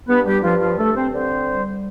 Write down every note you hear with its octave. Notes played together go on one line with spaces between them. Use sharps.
G2 B3 B4
G3 G4
G2 F3 F4
F3 F4
G2 A3 A4
C4 C5
D3 C4 C5
G3